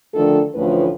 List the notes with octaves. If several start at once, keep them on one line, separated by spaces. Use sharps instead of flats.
D3 D#3 F3 A3 D4 A4
D2 A2 E3 F3 C#4 B4